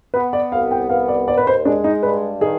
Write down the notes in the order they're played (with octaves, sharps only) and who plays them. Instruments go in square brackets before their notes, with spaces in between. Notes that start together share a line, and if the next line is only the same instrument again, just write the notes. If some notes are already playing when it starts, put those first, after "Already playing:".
[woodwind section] B3 [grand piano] B4
[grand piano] D5
[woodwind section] C2 [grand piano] F5
[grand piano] G5
[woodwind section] B3 [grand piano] F5
[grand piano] D5
[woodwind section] D#2 [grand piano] D5
[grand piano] B4
C5
[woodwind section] G#3 [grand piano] D4
[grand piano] D#4
[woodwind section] G2 [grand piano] B4
[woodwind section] D#3 [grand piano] G#4